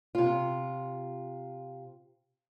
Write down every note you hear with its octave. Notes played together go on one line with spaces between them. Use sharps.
C3 F4